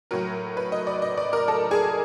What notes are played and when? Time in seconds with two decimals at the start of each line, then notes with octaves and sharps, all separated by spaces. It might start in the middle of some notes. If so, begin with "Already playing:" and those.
0.11 A2 F#3 A#4
0.57 B4
0.72 D#5
0.87 D5
1.02 D#5
1.17 D5
1.33 A#4
1.48 A4
1.71 G#4